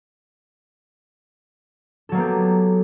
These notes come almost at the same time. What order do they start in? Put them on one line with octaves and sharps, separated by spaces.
A4 F#3 A#3 B3 G4